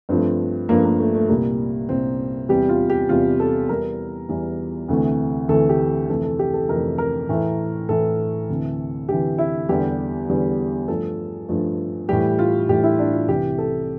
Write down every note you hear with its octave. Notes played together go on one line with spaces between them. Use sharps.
G2 F3 A3 C4
G2 F3 A3 A#3
A#3
A3
A3
C2 A#2 G3 A#3
C2 A#2 G3 C4
E2 C3 G3 G4
F4
G4
E2 C3 G3 F4
A4
E2 E3 G3 A#4
E2 E3 G3
D2 C3 E3 A3
D2 C3 E3 A3 A4
G4
F2 C3 E3 A3 A4
A4
G4
A4
F2 C3 E3 A3 A#4
A#4
A2 E3 A3
A2 E3 A3 A4
D2 C3 E3
D2 C3 E3 G4
E4
E2 D3 G3 G4
E2 D3 G3
G2 F3 A3 A4
G2 F3 A3
A2 E3 G3 G4
F4
A2 E3 G3 G4
E4
D4
F4
C2 C3 E3 G4
A4